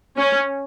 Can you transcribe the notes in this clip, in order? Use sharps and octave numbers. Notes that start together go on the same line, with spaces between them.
C#4